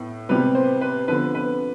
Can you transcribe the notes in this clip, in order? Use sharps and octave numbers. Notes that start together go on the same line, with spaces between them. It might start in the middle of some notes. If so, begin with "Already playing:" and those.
Already playing: A2 B3
C3 G3 B3 B4
C5
B4
D3 F3 B3 B4
B4